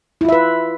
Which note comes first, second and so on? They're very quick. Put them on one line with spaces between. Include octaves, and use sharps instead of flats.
E4 F4 E5 B4